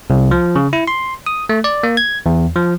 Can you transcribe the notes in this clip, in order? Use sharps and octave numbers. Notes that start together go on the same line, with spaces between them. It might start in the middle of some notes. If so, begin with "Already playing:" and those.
C2
F3
C#3
E4
C6
D#6
A3
D5
A#3
G#6
E2
F3